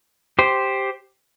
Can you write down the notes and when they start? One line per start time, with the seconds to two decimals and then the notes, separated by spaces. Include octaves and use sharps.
0.39 G4 C5